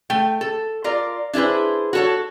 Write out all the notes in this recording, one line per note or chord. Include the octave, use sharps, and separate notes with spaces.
A3 G5
A4
F4 A#4 D5
D4 E4 G#4 B4 C5
F#4 A4 C#5